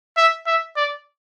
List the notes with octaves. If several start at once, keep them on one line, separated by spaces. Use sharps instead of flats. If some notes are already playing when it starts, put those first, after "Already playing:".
E5
E5
D5